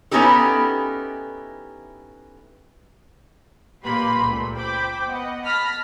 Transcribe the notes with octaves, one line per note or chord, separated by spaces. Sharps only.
B3 C#4 D#4 E4 G4 A4
A#2 A#3 G4 B4 B5 C6
C#2 A#2 A3
C5 G5 B5 D6
B3 D#5 F#5
A5 B5 F6 A#6 B6